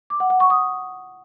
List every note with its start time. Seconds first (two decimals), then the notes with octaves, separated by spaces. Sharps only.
0.10 D6
0.20 F#5
0.30 F#5
0.40 C#6
0.50 D#6